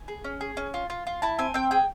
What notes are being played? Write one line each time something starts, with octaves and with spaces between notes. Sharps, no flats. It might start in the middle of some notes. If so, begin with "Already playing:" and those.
Already playing: G#5
G#4
C#4
G#4
C#4
F4
F4
F4
E4 A5
C4 G#5
C4 G5
G#4 G5